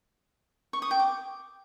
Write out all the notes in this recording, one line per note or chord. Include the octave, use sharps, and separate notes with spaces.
C#6
D#6
G5
D6